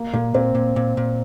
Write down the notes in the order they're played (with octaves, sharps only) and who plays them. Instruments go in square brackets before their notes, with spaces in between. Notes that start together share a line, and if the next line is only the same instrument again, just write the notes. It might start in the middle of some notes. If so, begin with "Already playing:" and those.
Already playing: [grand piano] A#3
[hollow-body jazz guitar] A#2 [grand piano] A#3
[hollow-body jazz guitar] A#2 [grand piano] C4
[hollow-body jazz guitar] A#2
A#2
A#2